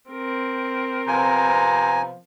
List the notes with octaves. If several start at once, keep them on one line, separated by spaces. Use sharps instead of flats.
C4 A#4
C3 F3 B3 G#5 A#5